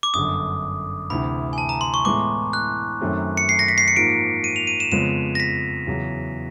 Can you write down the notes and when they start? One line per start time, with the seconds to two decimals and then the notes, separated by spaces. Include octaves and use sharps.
0.03 D6
0.14 G1 F#2 D3 D#6
1.10 D2 C3 E3 B5
1.53 G#5
1.58 A5
1.69 A#5
1.81 C6
1.94 C#6
2.05 A2 E3 G#3 B3 D6
2.53 F#6
3.01 F#2 D#3 F#3 A3 C4
3.37 C#7
3.49 C7
3.59 A#6
3.68 B6
3.78 C7
3.88 C#7
3.96 G#2 F3 A#3 D7
4.44 D#7
4.56 F7
4.67 D#7
4.80 E7
4.92 F2 C#3 F3 G#3 B3 E7
5.35 A#6
5.40 B6
5.87 E2 C#3 F#3